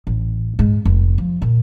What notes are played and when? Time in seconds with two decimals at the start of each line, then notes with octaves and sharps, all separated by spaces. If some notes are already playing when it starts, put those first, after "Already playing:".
0.07 A1
0.59 G#2 G#3
0.85 F1
1.18 F3
1.42 A#2